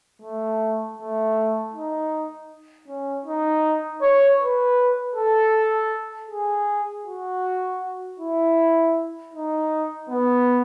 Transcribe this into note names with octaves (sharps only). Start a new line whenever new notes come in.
A3
A3
D#4
C#4
D#4
C#5
B4
A4
G#4
F#4
E4
D#4
B3